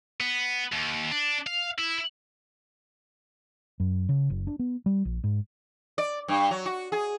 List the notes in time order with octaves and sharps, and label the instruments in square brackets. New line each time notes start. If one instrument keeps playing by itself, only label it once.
[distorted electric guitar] B3
D#2
D4
F5
E4
[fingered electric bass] F#2
C#3
F#1
D4
B3
G3
A#1
G#2
[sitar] D5
G2
F#3
F#4
G#4